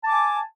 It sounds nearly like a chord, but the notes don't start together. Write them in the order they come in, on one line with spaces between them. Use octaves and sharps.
A5 D6 G#5